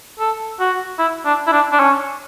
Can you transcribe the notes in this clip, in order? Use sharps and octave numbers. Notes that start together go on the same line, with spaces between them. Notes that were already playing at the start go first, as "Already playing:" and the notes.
A4
F#4
E4
D4
E4
D4
D4
C#4